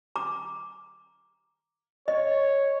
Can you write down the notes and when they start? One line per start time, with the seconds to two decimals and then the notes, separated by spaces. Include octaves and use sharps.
0.16 A#5 D6
2.08 C#5 D#5